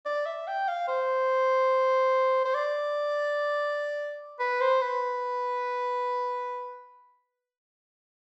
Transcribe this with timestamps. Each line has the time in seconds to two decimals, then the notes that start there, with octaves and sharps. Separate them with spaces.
0.05 D5
0.26 E5
0.48 G5
0.68 F5
0.88 C5
2.45 C5
2.54 D5
4.40 B4
4.61 C5
4.81 B4